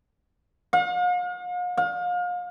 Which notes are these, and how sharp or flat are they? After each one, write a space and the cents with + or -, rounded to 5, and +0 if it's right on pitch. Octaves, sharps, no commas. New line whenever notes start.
F5 +45
F5 +35